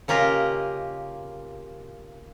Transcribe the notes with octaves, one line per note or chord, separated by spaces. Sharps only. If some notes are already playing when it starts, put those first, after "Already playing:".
C#3 A#3 F4 G4 A#4 D#5